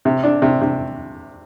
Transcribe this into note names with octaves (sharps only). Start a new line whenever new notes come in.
C3
D4
C3
C3